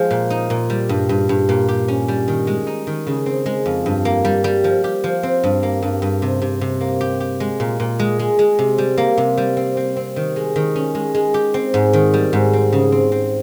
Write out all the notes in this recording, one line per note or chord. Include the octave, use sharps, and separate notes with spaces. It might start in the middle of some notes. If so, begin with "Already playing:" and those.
Already playing: F3 G#3 G4
A#2
D#4
A#2
G3
G2
G2
G2
A#2
G4
C#4
G3
D#3
G#3
D#4
D#3
C#3
C4
G#3
F2
G2
A#3
G3
G3
F3
G4
F3
C4
G2
A#3
G2
G2
C3
C3
C3
A#3
G4
G4
G#3
A#2
A#2
G#3
G#3
G#3
C3
G3
A#3
C3
G3
C4
C4
C4
D#3
G#3
D#3
C#4
G#3
G#3
G4
C4
G#2
D#3
G3
G#2
C4
C#3
C4
C4